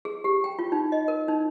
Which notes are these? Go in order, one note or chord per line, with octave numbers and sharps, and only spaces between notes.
G#4
G4
G5
F4
D#4
D#5
A#4
D#4